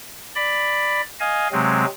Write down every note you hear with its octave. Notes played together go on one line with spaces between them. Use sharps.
D5 B5
D#5 F5 G#5
C3 F#3 G#3 C4